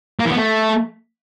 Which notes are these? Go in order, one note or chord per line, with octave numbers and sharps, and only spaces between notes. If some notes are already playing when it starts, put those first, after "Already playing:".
A#3
E3
B3
A3